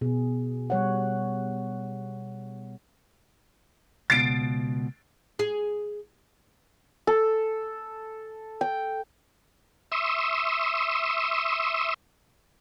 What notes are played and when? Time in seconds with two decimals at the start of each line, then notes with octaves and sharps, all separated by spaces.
0.01 B2 G#4
0.70 G3 C#5 F#5
4.10 C#2 B2 A6 C7 D7
5.39 G#4
7.07 A4
8.61 G5
9.92 E5 C6 C#6 D#6 E6